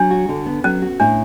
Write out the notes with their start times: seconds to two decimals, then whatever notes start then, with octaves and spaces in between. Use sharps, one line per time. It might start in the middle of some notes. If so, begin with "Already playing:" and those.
Already playing: F#3 D4
0.11 F#4
0.29 D3
0.46 B3
0.64 F#3 C#4
0.82 F#4
1.00 A2 D4